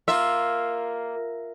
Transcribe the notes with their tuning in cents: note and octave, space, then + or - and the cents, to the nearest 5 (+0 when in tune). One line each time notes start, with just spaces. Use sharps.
A#3 +0 F4 +0 E5 +0